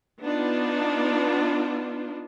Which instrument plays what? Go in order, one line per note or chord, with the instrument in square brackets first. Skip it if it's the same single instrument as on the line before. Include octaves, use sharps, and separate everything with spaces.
[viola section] B3 D4 D#4 F4